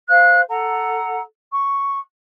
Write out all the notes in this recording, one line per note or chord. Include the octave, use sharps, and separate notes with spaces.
C5 F5 F#6
A4 F#5 A#5
C#6